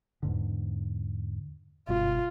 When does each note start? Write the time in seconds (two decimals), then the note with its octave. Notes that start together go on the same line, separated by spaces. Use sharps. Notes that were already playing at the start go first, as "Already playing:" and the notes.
0.23 E2 G#2 D3
1.88 F#1 G2 B2 F4